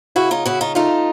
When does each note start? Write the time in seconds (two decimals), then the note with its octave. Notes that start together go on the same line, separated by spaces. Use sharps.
0.16 C#3 E4 F#4
0.31 D#4 F4
0.46 C#3 E4 F#4
0.61 D#4 F4
0.75 A3 D#4 F4